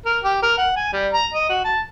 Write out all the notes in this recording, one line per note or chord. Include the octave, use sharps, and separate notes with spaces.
A#4
G4
A#4
F#5
G#5
G3
A#5
D#5
F#4
A5